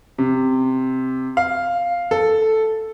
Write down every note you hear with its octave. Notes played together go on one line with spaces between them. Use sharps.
C3
F5
A4